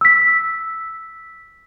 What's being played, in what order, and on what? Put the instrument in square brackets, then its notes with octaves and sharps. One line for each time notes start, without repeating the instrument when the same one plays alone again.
[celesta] E6 B6